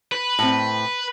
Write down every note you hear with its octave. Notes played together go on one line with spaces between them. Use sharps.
B4
A2 C4